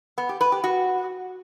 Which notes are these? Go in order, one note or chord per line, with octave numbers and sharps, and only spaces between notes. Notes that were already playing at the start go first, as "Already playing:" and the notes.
B3
G4
B4
G4
F#4